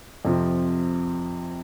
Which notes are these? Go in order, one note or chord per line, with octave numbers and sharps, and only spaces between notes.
F2 C3 F3